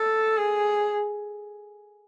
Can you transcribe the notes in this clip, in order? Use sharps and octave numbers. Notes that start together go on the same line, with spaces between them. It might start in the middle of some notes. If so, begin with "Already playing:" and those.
Already playing: A4
G#4